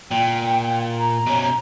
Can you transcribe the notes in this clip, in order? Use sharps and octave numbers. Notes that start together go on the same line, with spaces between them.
A#2 G5
A#5
B2 C#4